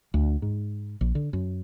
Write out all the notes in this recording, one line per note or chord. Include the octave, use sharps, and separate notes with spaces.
D2
G#2
A#1
D3
F#2